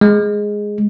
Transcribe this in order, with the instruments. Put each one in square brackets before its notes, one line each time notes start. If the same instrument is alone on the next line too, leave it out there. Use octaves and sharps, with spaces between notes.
[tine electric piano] G#3